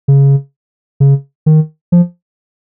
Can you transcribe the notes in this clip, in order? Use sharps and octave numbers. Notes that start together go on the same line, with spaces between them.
C#3
C#3
D#3
F3